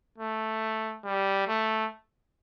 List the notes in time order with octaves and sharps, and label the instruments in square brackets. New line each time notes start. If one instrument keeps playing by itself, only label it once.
[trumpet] A3
G3
A3